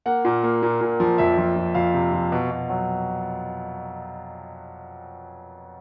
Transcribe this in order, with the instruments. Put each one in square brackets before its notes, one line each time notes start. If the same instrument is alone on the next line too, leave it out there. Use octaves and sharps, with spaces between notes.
[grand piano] A#3 F#5
A#2
A#3
A#2
A#2
F3
F2 E5
F3
F3
F2 F5
C3
F3
B2
B2
F#3